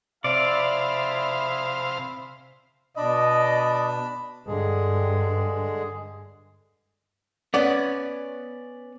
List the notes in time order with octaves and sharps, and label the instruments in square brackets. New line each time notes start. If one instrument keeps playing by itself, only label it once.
[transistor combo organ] C3 C5 F5 [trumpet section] E4 G#4 E5 [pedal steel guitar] D5
[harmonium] B2 [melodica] D4 B5 [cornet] D5 [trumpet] D#5
[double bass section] G2 [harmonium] D3 G#3 G#4
[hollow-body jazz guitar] B3 C#4 [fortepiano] D5